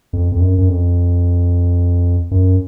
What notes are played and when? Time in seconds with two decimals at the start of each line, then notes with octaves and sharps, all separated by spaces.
0.13 F2
0.32 F2
0.40 F#2
0.58 F#2
0.69 F2
2.31 F#2